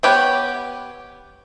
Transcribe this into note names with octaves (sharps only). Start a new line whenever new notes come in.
B3 G4 B4 C#5